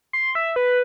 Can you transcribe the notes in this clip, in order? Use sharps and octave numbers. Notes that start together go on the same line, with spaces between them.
C6
E5
B4